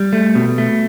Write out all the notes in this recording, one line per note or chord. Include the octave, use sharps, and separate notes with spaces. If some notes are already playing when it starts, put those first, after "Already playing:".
Already playing: G3
A3
B2
A3